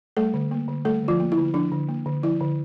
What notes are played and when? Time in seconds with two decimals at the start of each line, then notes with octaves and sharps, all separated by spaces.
0.17 G3 A3 A4
0.34 D3
0.51 A#3
0.68 D3
0.85 G3 A3 A4
1.02 D3
1.08 F3 F4
1.20 A#3
1.32 E4
1.37 D3
1.54 F3 D4
1.72 D3
1.88 A#3
2.06 D3
2.23 F3 E4
2.41 D3